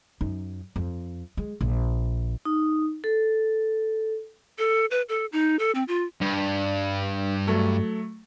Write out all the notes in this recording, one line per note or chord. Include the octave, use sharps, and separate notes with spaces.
F#2 D#4
F2
G#3
A#1
D#4
A4
A4
B4
A4
D#4
A4
C4
F4
G2
F#3 A3